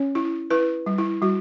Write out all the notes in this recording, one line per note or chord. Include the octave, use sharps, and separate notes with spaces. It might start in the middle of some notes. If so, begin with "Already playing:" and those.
Already playing: C#4 C#5
E4
E4 B4
G3
E4
G3 F#4